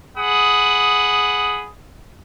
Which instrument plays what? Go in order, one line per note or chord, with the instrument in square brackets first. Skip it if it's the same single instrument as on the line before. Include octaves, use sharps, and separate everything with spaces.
[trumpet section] G#4 F#5 B5 D#6